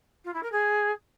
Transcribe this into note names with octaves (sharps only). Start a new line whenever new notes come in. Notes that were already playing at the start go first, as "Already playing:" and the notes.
F4
E4
A#4
G#4